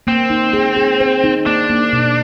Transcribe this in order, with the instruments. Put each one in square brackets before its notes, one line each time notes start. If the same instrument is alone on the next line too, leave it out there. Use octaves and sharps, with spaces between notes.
[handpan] A#3 [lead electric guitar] C4
[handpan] D#4
G#4
G#4
C5
D#4
[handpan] A#3 [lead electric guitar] D4
[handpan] A#3
B2